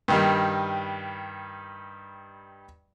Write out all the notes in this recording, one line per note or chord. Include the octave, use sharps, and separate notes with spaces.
G2 D#3 G3